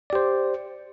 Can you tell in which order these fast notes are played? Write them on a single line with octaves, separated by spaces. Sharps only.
D5 G4 C5